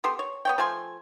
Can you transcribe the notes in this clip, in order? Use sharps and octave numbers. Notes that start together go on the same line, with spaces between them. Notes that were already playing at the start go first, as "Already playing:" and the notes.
B3 G4 A4 C6
C#5
B3 C#5 G5
F3 A3 G#5 C6